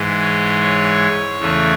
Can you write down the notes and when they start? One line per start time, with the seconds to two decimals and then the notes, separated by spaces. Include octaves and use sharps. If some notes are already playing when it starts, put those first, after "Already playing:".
Already playing: G#2 E3 G#3
0.22 C#5
0.61 C#5
1.39 E2 C#3 E3 A3